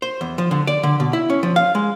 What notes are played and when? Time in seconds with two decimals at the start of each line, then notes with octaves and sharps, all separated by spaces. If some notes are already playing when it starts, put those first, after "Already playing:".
0.02 C5
0.21 E2
0.38 F3
0.51 D3
0.67 D5
0.83 D3
1.00 B2
1.13 E4
1.30 C#4
1.43 F3
1.56 F5
1.75 G#3